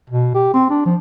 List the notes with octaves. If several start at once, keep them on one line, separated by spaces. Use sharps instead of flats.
B2
G4
C4
D4
F3